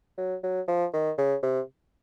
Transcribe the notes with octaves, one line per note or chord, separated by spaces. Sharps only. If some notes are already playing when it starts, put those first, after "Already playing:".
F#3
F#3
F3
D#3
C#3
C3